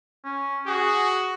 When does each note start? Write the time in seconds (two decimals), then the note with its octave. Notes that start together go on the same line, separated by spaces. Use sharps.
0.25 C#4
0.67 F#4 G#4